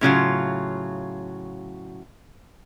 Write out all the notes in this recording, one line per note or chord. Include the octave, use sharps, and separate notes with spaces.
A2 C#3 F#3 F4